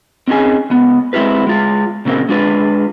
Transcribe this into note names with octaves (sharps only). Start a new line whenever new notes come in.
C4 C#4 D#4 G4 G#4 G#5
C#2 B3
G#3 C4 E4 F4 G4 B4
G#3 F4
A#2 C#3 A#3 C4
G#3 D4 F4 B4